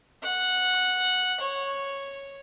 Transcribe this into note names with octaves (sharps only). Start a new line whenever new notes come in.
F#5
C#5